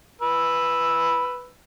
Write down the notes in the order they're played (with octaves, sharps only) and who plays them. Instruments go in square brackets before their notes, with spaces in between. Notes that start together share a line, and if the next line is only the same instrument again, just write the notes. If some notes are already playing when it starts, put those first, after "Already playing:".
[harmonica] B4 E6